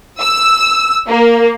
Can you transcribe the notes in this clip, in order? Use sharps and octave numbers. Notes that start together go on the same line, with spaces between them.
E6
A#3